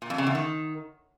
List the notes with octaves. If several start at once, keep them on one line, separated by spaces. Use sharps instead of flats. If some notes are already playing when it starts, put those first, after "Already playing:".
A#2
F2
C#3
E2
D#3